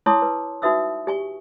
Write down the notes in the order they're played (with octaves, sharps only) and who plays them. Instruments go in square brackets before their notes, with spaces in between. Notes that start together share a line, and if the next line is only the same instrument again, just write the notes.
[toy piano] E4 C#5 A5 C6 D6 D#6
B4
D#4 F#4 B4 E5 D#6 E6
G4 G#5 C#6